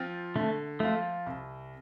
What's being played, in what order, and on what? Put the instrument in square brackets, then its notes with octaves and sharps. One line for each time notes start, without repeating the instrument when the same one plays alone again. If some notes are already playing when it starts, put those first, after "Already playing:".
Already playing: [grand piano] F3 C4 F4
[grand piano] D3 [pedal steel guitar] A3
[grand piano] F3 C4 F4 [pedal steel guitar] A3
[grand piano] C2